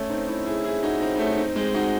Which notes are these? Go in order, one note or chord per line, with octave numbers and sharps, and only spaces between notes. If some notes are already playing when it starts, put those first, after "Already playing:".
Already playing: A3 C#4
C4 D#4
C#4 E4
E4 G#4
E4 G#4
D#4 F#4
C4 D#4
D#4
A3 C#4
C4 D#4
G#3 C4
D#4 F#4